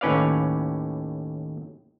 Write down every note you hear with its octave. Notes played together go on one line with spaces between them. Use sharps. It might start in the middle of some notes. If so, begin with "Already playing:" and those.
D#2 A2 C#4 B4 D5 F5